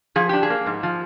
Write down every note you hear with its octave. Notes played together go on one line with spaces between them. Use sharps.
F3 G#4
D4 G4
G#4
A#3
G#2
F3